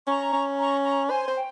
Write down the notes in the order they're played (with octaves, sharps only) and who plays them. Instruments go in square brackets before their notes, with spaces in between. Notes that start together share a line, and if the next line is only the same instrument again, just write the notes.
[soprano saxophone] C#4 [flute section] A#5 C#6
[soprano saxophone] C#4
[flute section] A#5 C#6
A#5 C#6
[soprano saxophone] C5 [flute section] G#5 C6
[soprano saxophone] C5
[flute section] G5